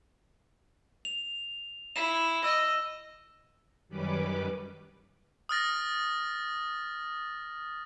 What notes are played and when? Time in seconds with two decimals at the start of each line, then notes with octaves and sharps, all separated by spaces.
1.05 F7
1.96 E4 E7
2.44 D#5 E6
3.88 F#2 D#3 G3 C#4 B4 D6
5.49 D#6 F6 A6 A#6